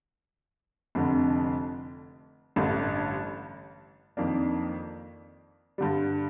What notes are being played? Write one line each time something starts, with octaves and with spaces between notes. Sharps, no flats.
F1 F2 D3
A1 G2 D3 A3
F2 D#3 A#3 D4
G2 D3 G3